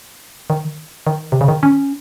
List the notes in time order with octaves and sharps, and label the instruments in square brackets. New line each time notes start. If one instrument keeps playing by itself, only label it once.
[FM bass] D#3
D#3
C3
C#3
D#3
C#4